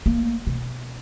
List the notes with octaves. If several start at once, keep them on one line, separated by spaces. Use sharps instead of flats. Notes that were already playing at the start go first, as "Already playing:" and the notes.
A#3
B2